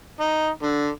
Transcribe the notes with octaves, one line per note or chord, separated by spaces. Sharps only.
D#4
D3